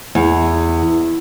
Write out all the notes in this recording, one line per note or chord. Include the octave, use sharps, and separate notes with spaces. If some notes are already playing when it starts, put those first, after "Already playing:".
E2